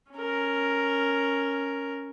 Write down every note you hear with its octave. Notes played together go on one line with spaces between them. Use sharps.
C#4 A#4